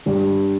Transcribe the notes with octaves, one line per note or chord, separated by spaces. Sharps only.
G1 G2 G3 D4 G4